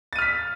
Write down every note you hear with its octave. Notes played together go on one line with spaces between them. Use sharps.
F6 A6 B6 D#7